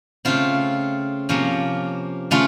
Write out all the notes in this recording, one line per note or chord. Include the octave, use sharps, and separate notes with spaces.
C#3 A3 C4 F4
C3 F3 A#3 C#4
C#3 A3 C#4 F4